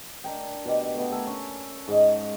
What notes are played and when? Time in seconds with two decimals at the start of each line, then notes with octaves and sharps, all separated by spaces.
0.24 D4 A#4 G5
0.65 B2 G4
0.95 A3 B3
1.12 A4 A#4 G#5
1.27 C#4
1.88 G#2 D#5